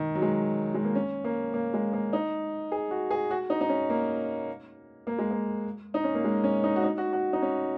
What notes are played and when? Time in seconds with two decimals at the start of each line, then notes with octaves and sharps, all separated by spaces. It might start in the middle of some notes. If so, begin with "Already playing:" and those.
Already playing: D#3
0.15 F#3
0.22 G#3
0.74 G#3
0.85 A#3
0.95 C#4
1.24 A#3
1.54 A#3
1.74 G#3
1.93 A#3
2.13 D#4
2.72 G#4
2.91 F#4
3.10 G#4
3.31 F#4
3.50 D#4
3.61 D#4
3.69 C#4
3.90 A#3
5.07 A#3
5.19 G#3
5.31 A#3
5.94 D#4
6.04 C#4
6.15 A#3
6.25 G#3
6.44 C#4
6.64 D#4
6.76 F#4
6.83 D#4
6.98 F#4
7.13 F#4
7.33 D#4
7.42 C#4